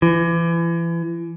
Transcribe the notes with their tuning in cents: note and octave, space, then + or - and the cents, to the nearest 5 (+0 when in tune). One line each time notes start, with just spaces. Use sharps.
E3 +35